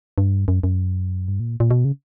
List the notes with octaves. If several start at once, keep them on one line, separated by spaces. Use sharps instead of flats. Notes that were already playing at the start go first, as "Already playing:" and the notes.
G2
F#2
F#2
G2
A#2
A#2
B2
C#3